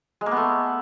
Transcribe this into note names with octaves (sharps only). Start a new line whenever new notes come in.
G#3
A#3
B3
A3